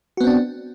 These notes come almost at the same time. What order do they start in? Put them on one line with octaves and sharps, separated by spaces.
F#4 B3 C4 D4